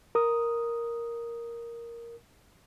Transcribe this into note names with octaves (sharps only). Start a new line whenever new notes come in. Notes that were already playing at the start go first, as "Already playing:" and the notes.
A#4 D#6